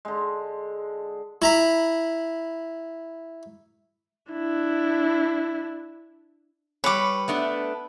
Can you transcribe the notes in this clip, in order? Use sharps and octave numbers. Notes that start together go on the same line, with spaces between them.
D3 G#3
E4 A#5 B5
D4 E4
G3 B4 C#5 D6
A3 B3 D4